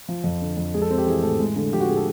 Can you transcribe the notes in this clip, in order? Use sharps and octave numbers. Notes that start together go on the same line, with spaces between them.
F3
F2
D3
F2
G#3 G#4
A4
C4
G4
E3 G#4
A2 A4
G#3
D3
F3 G4
F#4
D3 G#4
A4